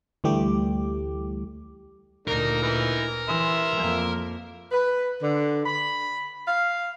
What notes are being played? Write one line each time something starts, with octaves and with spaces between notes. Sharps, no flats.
D2 E3 G3 A3 G4 D6
D2 A#2 A#3 D#4 A#4
E3 D#4 B4
E3 E5 C6
F2 A#3
B4
D3
B5
F5